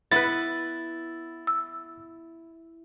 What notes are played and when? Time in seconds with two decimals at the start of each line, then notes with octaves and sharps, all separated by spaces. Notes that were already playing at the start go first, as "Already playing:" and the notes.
0.12 B3 E4 B4 A6
1.47 E6